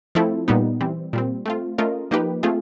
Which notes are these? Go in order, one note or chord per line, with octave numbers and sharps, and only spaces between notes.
F3 A3 C4 E4 A4
A#2 G3 B3 D#4
E3 G3 C4
A#2 G3 C4
A3 C4 F4
A3 C#4 F4 A#4 D#5
F3 A#3 D#4 G4 B4
A3 C4 F4 G#4